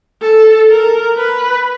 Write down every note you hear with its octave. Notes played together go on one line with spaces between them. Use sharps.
A4
A#4
B4